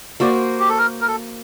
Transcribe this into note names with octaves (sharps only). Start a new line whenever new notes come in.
A#3 F#4 C5 D5
G4
A4
A#4
A#4
A4